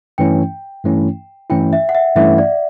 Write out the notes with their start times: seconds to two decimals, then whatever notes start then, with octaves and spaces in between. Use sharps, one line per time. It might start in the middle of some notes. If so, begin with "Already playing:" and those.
0.18 G2 E3 A3 C#4 E4 G5
0.84 G2 E3 A3 C#4 E4
1.50 G2 E3 A3 C#4 E4 G5
1.73 E5
1.89 F#5
1.95 E5
2.15 G2 E3 A3 C#4 E4 E5
2.38 D5